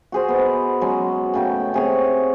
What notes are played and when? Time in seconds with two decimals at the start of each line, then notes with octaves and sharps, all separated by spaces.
0.12 F#4 G#4 C5
0.29 B3 D#5
0.81 F#3 G#3 C#4
1.34 A2 C#3 G5
1.74 C3 G#4 C#5